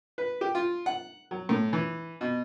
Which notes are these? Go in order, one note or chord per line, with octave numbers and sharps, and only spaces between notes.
B4
G4
F4
F#5
F#3
A2
E3
B2